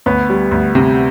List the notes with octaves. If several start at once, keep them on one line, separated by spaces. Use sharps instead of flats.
D2 B3 B4
G3
D2
C3